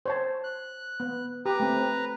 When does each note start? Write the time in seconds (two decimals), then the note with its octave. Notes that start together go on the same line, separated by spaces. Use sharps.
0.06 C5 C#5 A5
0.44 F#6
1.00 B3
1.46 G4 B4 A#5
1.60 A3 C4